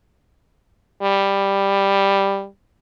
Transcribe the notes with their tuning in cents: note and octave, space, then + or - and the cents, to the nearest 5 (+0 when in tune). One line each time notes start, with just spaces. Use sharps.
G3 +5